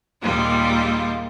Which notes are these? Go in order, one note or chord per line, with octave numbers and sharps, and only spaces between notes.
D#2 A#2 G3 G#3 F4